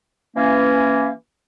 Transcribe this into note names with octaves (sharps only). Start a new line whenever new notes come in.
E3 A#3 C#4